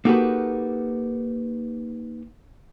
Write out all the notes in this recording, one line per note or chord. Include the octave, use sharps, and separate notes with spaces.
A#3 D#4 F#4 G4 A4 B4